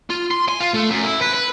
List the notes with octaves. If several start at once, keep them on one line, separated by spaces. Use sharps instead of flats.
F4
C6
G#5
F4
A3
F#2
E4
B4
B4